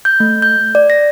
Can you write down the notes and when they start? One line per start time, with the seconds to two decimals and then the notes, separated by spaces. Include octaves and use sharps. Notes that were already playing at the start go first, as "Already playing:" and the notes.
0.05 G6
0.20 A3
0.42 G6
0.75 D5
0.90 A#6